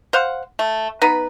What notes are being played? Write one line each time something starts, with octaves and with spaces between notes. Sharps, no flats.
C5 F5 F#5
A3
B3 D#4 B4